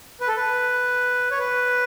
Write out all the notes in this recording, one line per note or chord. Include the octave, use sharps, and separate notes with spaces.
B4
A4
B4
C#5
B4